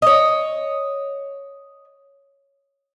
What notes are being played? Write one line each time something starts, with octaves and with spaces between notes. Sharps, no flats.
C#5 D#5